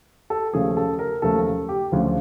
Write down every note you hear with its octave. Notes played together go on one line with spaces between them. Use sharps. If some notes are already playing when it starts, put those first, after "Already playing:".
A4
D#2 C#3 F3 A3 G#4
A4
A#4
D#2 C#3 F3 A3 A4
G4
D2 C#3 F3